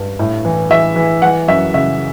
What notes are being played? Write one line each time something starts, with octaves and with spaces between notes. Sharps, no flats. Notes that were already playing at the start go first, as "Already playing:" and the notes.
Already playing: G2
A2
E3
E3 E5
E3
E3 F#5
F#2 E5
C#3 E5